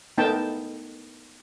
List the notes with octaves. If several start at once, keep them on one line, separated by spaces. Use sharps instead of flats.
A3 B3 D#4 A#4 G5 A5